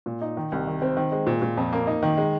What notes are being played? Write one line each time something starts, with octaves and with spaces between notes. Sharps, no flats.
A#2
D#4
D#3
C2
D#3
C4
D#3
G#3
A#2
A#2
F2
A#3
D#4
D#3
G#3